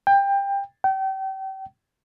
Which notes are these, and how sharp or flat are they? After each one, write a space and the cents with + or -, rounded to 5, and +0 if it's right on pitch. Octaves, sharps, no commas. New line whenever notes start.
G5 +20
G5 -35